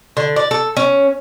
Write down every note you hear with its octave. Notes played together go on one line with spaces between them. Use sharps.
D3
D5
A4
C#4